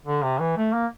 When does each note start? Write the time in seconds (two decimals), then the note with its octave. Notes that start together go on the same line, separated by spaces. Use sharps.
0.06 D3
0.23 C3
0.40 E3
0.57 A3
0.73 A#3